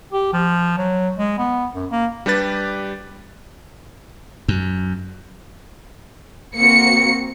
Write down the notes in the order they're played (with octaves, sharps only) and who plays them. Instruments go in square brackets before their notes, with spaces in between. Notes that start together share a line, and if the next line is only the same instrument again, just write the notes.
[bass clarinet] G4
F3
F#3
G#3
B3
F#2
A#3
[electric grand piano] G3 D4 G4 B4 A6
[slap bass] F#2
[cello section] A#3 C4 F#4 [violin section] C#7